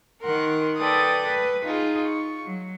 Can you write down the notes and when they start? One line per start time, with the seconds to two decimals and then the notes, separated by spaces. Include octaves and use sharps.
0.22 D#3 A#4 F#5 C6
0.78 A4 B4 D5 G5 D#6
1.27 B4
1.65 D#4 F4 G#4
2.06 C#6
2.45 F#3